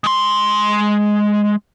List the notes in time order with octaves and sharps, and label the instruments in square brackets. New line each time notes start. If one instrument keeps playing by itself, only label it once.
[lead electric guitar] G#3 C6